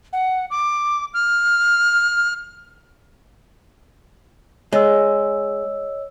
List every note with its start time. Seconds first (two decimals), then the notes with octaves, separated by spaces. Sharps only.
0.13 F#5
0.50 D6
1.14 F6
4.72 G#3 C#5 D#5 E6